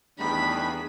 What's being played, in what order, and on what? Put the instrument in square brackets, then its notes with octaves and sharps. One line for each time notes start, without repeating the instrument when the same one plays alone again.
[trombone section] E2 G3 [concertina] A3 B3 D#4 [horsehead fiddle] D4 G#4 [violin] B5